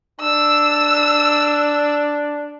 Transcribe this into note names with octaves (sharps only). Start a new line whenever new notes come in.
D4 E6